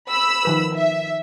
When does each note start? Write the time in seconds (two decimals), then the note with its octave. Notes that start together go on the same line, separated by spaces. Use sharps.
0.10 B5 E6
0.45 D#3 F3 B4
0.74 E5